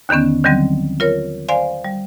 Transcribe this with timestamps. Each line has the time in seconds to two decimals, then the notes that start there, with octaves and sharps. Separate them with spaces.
0.09 D#2 D3 D#3 B3 C#4
0.44 D3 D#3 F#3 G3 C4
1.00 F4 A#4 C#5
1.48 C5 D5 F5 G#5 C6
1.85 G3